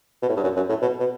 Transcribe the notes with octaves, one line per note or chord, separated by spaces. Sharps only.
B2
A2
G2
F#2
F#2
A2
B2
B2